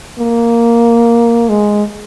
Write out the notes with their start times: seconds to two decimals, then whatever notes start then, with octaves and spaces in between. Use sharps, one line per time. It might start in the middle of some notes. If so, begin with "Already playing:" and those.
0.19 A#3
1.49 G#3